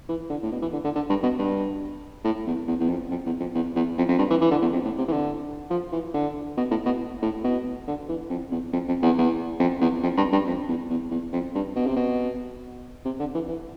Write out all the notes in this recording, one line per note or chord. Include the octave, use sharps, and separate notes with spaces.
E3
D3
A2
B2
E3
D3
D3
D3
G2
B2
G2
A2
E2
E2
E2
F2
F2
E2
F2
E2
E2
F2
F2
G2
E3
E3
D3
E2
F2
A2
C3
E3
D3
F3
E3
D3
B2
A2
B2
A2
B2
D3
E3
F2
E2
F2
F2
E2
E2
F2
E2
F2
G2
G2
F2
E2
E2
E2
F2
G2
B2
C3
B2
C3
D3
E3
E3